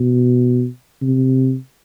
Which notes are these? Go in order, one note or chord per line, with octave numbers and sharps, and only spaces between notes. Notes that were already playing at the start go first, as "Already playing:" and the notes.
Already playing: B2
C3